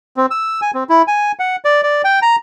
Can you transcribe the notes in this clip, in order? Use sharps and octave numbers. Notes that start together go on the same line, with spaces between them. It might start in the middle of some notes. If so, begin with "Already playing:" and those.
C4
E6
G#5
C4
E4
G#5
F#5
D5
D5
G5
A#5